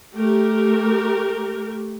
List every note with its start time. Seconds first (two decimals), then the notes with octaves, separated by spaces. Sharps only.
0.14 A3 G4 A#4